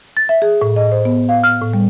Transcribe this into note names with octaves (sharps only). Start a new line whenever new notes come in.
A6
E5
G#4
A2
D#5
C5
B3
F5
F6
A2
G3